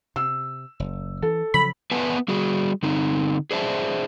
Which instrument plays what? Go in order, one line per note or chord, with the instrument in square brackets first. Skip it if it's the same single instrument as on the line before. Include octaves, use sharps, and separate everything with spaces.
[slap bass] C3 [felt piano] E6
[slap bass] F#1
[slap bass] E3 [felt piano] A4
[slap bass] C#3 F3 F#3 [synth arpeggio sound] B5
[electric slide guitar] B3 B4 E5 F#5 G#5 A5
G3 F#4 G#4
D3 C4 D#4
G#4 C5 D5 E5 G#5 A5